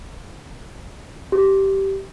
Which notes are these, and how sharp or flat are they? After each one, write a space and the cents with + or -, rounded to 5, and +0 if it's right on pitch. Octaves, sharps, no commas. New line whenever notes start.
G4 -15